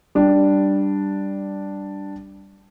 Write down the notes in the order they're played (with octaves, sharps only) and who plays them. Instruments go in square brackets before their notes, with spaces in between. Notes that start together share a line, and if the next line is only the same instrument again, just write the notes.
[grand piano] G3 D4